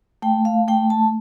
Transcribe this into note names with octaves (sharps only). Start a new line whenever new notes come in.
A3 G5
F5
A3 G5
A5